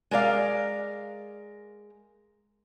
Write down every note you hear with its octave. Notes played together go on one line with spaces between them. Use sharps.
G#3 A#4 D5 F5